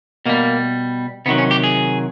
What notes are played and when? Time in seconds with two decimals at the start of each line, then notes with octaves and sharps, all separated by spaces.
0.26 B2 G3 A#3
1.26 C3 D#3 F#3 B3
1.38 C#4
1.51 G4
1.64 G#4